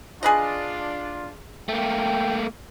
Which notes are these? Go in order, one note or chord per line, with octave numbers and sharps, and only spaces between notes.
D4 F4 G#4 B4 D#5
A3 A#3 G5